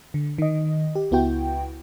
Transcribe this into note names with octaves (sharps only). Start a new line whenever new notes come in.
D3
D#3 D#5
G4
C#2 B3 E4 F#4 G5